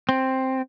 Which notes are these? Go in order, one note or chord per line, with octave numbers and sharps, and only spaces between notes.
C4